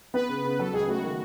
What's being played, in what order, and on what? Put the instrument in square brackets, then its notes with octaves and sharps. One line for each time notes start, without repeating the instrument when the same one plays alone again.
[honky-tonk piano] B3 [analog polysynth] B4
[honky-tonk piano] C#3
C#3
[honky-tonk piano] F#3 [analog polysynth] A4
[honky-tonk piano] C#2 [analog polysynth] G#4
[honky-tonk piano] A3 [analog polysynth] F#4
[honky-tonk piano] D#3